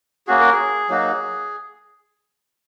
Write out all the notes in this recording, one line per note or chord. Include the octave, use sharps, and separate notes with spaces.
A#3 C#4 F#4 G#4
A#4
G#4
F#3 A#3 D#4 F#4